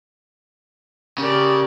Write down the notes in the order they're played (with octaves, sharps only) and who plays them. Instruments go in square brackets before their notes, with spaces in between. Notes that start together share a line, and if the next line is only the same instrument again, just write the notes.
[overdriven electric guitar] C#3 [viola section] G4 A#4 D5